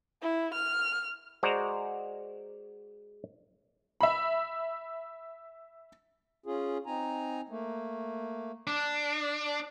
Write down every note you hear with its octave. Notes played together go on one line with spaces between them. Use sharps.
E4
F6
G#3 F#4 C5 D5 A#5
E5 B5
C#4 F4 G#4
C4 D#4 G#5 A#5
A3 A#3
D4